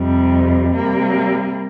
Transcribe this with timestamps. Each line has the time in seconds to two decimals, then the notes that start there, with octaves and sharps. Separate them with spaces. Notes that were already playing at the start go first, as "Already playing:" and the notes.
Already playing: F2 C3 G3
0.73 C3 G3 A#3